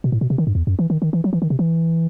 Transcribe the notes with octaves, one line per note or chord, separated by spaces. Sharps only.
B2
A2
B2
C3
D#3
G2
E2
F#2
E3
D#3
D#3
E3
F#3
E3
D#3
C3
E3